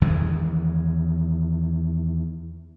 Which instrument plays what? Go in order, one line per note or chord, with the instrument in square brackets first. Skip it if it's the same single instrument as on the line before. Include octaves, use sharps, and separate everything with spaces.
[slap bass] E2 D#3 E3 G#3